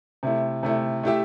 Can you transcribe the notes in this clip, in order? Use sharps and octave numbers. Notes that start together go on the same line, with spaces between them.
C3 A3 E4
C3 A3 E4
A3 E4 G4 E5